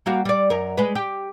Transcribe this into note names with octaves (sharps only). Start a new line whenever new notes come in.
G3 A#3 F#4
G3 D5
F#2 A#4
G#3 B4
G4